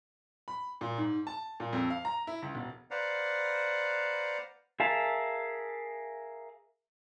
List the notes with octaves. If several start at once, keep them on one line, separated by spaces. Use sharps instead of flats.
B5
A#2
G#2
A5
A#2
F2
F5
A#5
E4
C#2
E1
B4 C5 D5 F5 F#5 A#5
G#4 A#4 E5 F5 A5